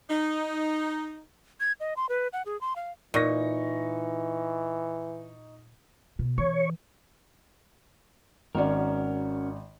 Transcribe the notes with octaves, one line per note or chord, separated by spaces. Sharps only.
D#4
G#6
D#5
C6
B4
F#5
G#4
C6
F5
A#2 E3 D#4 C#6 A#6
B2
E3 C#5
G#1 C#4 F#4 A#4 D5